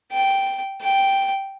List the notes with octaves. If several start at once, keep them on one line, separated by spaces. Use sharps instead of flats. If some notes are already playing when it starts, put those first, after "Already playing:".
G5
G5